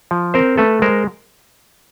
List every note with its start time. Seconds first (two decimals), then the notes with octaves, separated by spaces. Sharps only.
0.11 F3
0.34 C4 A#4 C5
0.58 A3 A4 B4
0.82 G#3 A#4 C5